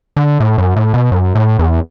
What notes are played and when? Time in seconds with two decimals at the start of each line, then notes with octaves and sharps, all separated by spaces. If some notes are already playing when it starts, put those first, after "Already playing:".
0.17 D3
0.40 A2
0.58 F#2
0.76 A2
0.94 B2
1.12 F#2
1.35 A2
1.59 E2